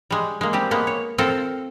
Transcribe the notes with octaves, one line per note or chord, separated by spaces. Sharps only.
G3 G#3
G#3 A#3
G3 C4 G4
G#3 A#3 B3
C#5
C4 F4 A4 A#4